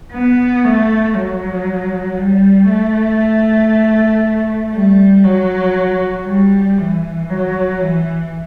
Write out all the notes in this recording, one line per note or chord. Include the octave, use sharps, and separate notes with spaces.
B3
A3
F#3
G3
A3
G3
F#3
G3
E3
F#3
E3